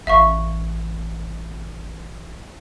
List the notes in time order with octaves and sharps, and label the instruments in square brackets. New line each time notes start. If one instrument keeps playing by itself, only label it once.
[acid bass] A1 [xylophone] E5 F5 C#6